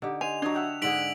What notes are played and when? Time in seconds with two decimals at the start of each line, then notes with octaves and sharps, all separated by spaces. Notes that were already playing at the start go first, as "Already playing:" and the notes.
0.02 D3 D#4 G4
0.21 C5 G#5 F7
0.42 F#3 D4 D#5 G#5
0.54 E5 F#5 G5
0.82 G#2 D3 G#4 B6 D7 F#7